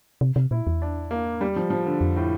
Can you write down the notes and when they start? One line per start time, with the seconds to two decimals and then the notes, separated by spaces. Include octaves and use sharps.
0.21 C3
0.36 C3
0.51 A#2 E4
0.67 E2
0.82 D4
1.11 A#3
1.41 G3
1.56 F3
1.70 F3
1.86 D3
2.01 F2
2.16 A2